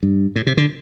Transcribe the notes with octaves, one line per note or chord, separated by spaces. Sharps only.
G2
A2
C3
D3